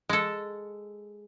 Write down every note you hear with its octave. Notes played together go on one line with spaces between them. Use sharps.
G#3 A4